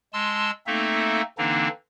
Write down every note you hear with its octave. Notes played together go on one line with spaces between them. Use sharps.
G#3 A5 C6 E6
A3 A#3 C4 D#4 A4 E5
D3 E3 A#3 C4 D4 D#4